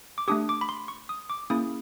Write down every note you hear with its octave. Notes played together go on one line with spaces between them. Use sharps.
D6
A3 D4 G4 D#6
D6
B5
C6
C#6
D#6
D6
A#3 C#4 E4 G#4 D#6